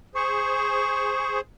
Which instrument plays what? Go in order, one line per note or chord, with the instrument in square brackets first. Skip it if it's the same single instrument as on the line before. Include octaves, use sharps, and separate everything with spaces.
[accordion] G#4 C5 [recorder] C#6